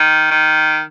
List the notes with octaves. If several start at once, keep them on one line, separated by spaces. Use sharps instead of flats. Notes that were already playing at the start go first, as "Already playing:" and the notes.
Already playing: D#3
D#3